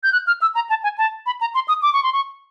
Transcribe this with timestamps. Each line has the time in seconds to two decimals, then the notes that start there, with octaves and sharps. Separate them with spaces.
0.03 G6
0.12 F#6
0.27 F6
0.42 E6
0.55 A#5
0.70 A5
0.83 G#5
0.98 A5
1.26 B5
1.41 A#5
1.55 C6
1.68 D#6
1.82 D6
1.93 C#6
2.03 C6
2.13 C#6